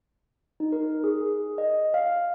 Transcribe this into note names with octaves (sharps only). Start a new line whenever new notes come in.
D#4
A#4
G#4
D#5
F5